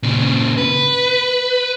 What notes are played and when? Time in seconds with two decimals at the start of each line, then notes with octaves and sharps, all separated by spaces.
0.03 A#2 C#3
0.58 B4